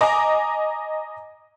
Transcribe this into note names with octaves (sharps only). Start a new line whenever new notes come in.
D#5 G#5 A#5 D6